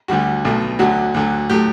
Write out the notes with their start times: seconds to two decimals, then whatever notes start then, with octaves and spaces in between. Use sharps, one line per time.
0.08 D2 D3 G3 F#4
0.45 B1 B2 A3
0.79 D2 D3 F#3 F#4
1.14 D2 D3 F#3
1.50 A2 F#3 A3 G4